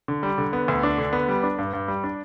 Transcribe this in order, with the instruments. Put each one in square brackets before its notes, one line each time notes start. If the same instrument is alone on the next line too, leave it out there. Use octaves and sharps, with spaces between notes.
[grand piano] D3
G3
D3
B3
D2
D4
D3
B3
G3
D4
G2
G2
G3
D4